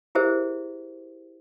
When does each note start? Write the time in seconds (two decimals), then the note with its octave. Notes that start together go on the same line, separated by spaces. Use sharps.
0.15 E4 G4 G#4 A#4 C5 E5